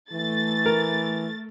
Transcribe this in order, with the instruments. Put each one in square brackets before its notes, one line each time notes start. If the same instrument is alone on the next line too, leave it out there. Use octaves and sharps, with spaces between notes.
[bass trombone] E3 [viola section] A3 [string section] A6
[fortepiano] A#4